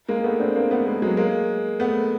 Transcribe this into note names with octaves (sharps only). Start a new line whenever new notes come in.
G#3 A#3
A3 B3
C4 D4
A#3 C4
A3 B3
G#3 A#3
F#3 G#3
G#3 A#3
A3 B3